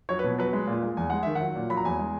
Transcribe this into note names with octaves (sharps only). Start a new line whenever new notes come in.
F#3 C#5
B2 B4
F#3 B4
G#3
A#2
G#3
E2 G#5
G#3 F#5
D#3 E5
F#5
F#3
A#2
F#3 B5
A#5
E2 G#5
G#3